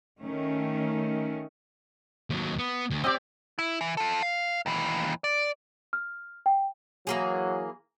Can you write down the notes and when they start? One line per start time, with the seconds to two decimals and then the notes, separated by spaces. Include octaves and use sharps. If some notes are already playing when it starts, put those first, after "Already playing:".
0.23 D#3 A3 C#4
2.30 D#2 F#3
2.59 B3
2.90 D2
3.04 C4 G4 D5 D#5
3.59 E4
3.81 E3
3.97 F4 A4
4.23 F5
4.66 D#2 E3
5.24 D5
5.93 F6
6.46 G5
7.07 E3 F#3 A#3 G#4